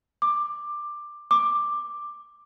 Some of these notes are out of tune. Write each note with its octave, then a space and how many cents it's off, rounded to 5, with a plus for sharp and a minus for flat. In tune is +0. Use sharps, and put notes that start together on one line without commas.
D6 +15
D6 +10